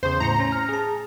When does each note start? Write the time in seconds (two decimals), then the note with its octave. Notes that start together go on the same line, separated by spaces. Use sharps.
0.03 E2 C#3 C5
0.20 A2 A#5 C#7
0.40 C#4 A#6
0.52 F6
0.69 G#4 A5